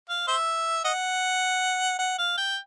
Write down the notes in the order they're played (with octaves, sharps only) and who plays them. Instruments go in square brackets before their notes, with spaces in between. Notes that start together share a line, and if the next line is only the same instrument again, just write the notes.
[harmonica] F5
C5 E5
D#5 F#5
F#5
F5
G5